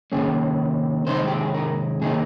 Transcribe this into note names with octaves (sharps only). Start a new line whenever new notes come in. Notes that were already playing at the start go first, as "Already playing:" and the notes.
C3 D#3 A#3 C#4 G#4
C3 D#3 G#3 D#4 C5
G4
G#4
A#4
C3 D#3 A#3 D#4 G#4